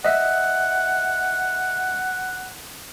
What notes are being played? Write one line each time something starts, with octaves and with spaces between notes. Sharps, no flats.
D#5 E5 F#5